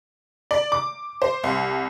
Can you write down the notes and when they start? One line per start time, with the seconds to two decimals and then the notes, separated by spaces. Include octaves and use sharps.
0.51 D5
0.72 D6
1.22 C5
1.44 C2